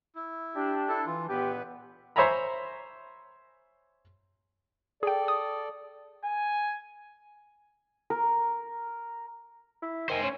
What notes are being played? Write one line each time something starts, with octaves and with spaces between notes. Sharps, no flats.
E4
D4 G4
E4 A4
E3 F4
C#2 A#2 B3 G4 B4
C5 C#5 E5 G#5 A#5 B5
G#4 A4 D5 G5
D#6
G#5
A#4
E4
D#3 C5 G#5
C#4